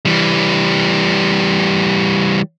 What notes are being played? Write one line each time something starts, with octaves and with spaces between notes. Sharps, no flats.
E3 G3